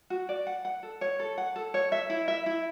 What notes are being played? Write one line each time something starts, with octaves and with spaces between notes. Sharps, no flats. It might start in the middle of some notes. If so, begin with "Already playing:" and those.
F#4
D5
F#5
F#5
A4
C#5
A4
F#5
A4
C#5
E5
E4
E5
E4